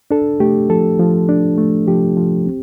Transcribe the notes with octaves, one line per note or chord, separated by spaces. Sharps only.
D4 A4
A3 G4
F3 A4
F3
D4
A3
F3 G4
F3
C4